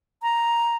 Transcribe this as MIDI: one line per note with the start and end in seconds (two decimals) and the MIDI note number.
0.22 0.76 82